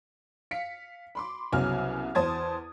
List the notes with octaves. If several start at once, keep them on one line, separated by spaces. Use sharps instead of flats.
F5 B6 C#7
B5 C6 D6
C2 C#3 F#3 B3 G#5 F6
E2 C5 A5 D#6 G#6 A6